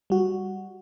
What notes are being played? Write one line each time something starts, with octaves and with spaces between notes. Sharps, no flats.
G3 F#4